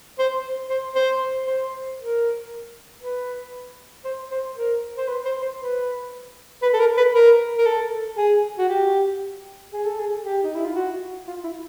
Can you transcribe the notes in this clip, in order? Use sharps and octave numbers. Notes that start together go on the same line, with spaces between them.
C5
C5
C5
C5
A#4
B4
C5
C5
A#4
C5
B4
C5
C5
B4
B4
A4
A#4
B4
A#4
A#4
A4
G#4
F#4
G4
G#4
A4
G#4
G4
D#4
E4
F4
F#4
F4
E4